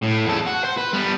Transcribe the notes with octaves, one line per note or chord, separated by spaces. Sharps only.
A2
E2 A4
F#4
C5
B4
G3 B3